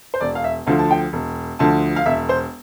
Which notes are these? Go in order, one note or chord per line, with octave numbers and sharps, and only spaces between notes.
C5
E1 D5
F5
E5
D2 D3 F3 F5
A5
G5
E1
D2 D3 F3 A5
F5
E1 E5
C5